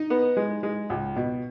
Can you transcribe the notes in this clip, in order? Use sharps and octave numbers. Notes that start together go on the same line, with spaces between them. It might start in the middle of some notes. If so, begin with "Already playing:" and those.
Already playing: D#4
B3
G#3
G#3
C#2
B2